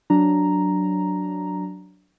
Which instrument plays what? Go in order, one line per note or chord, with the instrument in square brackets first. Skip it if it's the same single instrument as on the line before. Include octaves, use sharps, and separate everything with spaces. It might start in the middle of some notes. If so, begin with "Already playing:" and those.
[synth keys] F#3 D4 A#5